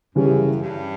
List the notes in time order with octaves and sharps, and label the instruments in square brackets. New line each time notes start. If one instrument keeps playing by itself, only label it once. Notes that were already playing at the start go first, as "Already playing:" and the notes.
[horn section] F#2 [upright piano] C#3 E3 G3 C#4
[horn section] G2